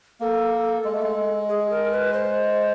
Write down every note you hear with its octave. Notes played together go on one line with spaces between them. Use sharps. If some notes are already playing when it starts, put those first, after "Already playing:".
A#3 A4
G#3
A3
G#3
G#4
A#4
B4
C5